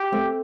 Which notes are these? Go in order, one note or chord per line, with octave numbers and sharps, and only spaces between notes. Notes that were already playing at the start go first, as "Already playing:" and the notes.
Already playing: G4
A3 C4